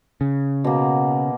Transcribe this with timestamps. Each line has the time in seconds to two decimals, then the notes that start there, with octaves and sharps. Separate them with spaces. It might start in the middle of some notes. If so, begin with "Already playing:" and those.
0.21 C#3
0.64 B2 A#3